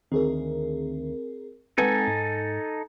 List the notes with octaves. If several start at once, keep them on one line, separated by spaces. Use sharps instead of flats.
D2 D#3 C4 G#4 A#4
G#3 A3 C4 D#4 A4 B4 F#5 G#5
G#2 A6 A#6